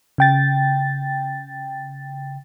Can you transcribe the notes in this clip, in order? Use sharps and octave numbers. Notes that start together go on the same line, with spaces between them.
C#3 G5 A6